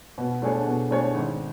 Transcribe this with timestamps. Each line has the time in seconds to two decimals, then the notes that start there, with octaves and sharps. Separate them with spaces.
0.18 B2
0.42 A3 D4 G#4 C#5
0.66 B2
0.91 A3 D4 G#4 C#5
1.14 G#1